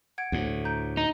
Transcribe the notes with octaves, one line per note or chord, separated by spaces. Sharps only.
F#5 G#6 D7
D2 A2
A#5 G6 D7
D#4 A#5